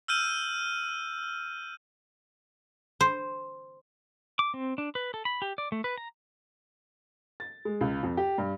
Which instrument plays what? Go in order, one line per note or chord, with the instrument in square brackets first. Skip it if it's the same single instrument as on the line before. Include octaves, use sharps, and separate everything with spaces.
[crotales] E6 F6 G6 D#7
[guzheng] C5
[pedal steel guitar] D6
C4
D4
B4
A4
B5
G4
D5
A3
B4
A#5
[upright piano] A6
G#3
C#2
F2
G4
G2